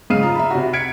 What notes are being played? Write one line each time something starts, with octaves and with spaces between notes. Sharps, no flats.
G#2 C#3 F5 F6 C7 D#7
F4 A#5 D#6
E5 A#5 B5
C3 F#4
G#6 B6 C#7 D7